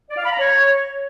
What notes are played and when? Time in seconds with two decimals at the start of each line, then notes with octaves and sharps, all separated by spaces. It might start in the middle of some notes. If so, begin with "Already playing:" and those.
0.10 D5
0.17 F5
0.25 B5
0.32 A#5
0.39 C#5